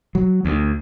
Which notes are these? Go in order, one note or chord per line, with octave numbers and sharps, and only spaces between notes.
F#3
D2